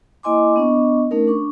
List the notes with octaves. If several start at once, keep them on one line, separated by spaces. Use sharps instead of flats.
A#3 E4 D#5 G#5 C6 D6
B3 D4 D#5 C#6
A3 C#4 D#4 A#4
D4 C#6